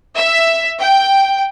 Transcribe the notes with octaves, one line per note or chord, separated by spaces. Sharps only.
E5
G5